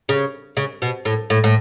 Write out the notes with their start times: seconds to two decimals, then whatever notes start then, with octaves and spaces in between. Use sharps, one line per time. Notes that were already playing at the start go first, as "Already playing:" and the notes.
0.09 C#3
0.57 C#3
0.82 B2
1.05 A2
1.30 A2
1.44 A2